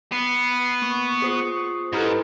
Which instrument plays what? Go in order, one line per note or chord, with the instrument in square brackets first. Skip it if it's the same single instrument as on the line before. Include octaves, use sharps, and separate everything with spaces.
[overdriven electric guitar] B3 [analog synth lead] C7
[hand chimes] A#3 [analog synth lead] C#6
[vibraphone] F4 D#6 [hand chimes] G#4 C5 C7
[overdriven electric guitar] G#2 [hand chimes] E4 A#5 F6 [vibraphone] G4 A4 [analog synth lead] B4